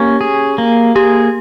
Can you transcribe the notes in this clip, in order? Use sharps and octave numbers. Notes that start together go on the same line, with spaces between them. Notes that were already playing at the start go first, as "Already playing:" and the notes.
Already playing: A#3 C#4 G4
G#4
A#3
G4 G#4